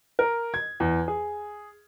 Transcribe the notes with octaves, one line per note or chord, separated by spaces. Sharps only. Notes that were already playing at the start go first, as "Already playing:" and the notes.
A#4
G#6
E2
G#4